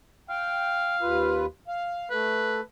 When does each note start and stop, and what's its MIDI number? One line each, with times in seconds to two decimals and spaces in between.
0.30 1.45 77
0.30 0.96 79
1.01 1.46 39
1.01 1.46 65
1.01 1.46 71
1.68 2.09 77
2.11 2.61 57
2.11 2.60 71